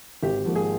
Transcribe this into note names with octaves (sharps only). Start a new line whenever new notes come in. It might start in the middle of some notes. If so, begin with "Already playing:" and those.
G#1 G4
G#2 F3 A#3
G#4